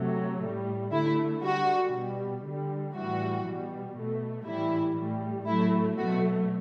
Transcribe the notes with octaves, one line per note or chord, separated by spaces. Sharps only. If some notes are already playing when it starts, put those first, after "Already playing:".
Already playing: C3 F#3 A3
A2 G3
D3 A3 E4
D3 G3 F#4
B2 G3
D3 G3
A2 E3 G3 F#4
B2 G3
B2 A3
A2 E3 G3 E4
A2 G3
A2 F#3 A3 E4
B2 F#3 A3 F#4